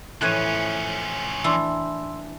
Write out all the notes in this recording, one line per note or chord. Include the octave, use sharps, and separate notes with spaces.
A2 E3 F3 C#4 E5 F#6 G#6 D#7
E3 D4 C6 E6